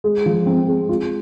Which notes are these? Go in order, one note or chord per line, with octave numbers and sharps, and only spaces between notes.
G#3
F3
C4
G#3
F4